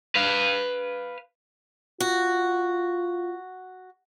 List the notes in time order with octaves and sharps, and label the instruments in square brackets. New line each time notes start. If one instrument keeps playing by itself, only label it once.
[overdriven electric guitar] B4 F5
[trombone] F4 [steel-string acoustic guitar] F#4